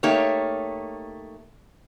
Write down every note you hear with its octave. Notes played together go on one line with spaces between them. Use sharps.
A3 A#3 D#4 G4 C#5